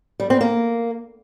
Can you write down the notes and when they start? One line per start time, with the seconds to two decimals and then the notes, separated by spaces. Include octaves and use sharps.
0.20 G3
0.30 C4
0.41 A#3